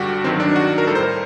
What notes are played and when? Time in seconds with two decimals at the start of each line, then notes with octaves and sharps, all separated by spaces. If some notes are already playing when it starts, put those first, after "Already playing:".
Already playing: G2 D3 G3 F#4 G4
0.24 G2 D#3 F#3 C4
0.40 D4
0.56 F#4
0.78 A#4
0.87 A2 G3 A4
0.95 C5
1.03 A#4